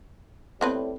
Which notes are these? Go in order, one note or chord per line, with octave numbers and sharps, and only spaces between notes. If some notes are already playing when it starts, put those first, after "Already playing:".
A2 G3 B3 C4 B4